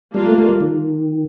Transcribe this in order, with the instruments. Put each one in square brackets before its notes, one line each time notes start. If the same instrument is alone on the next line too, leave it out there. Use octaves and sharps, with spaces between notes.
[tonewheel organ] G3 [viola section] A#3 D4 F4
[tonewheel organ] A3
A3
G3
D#3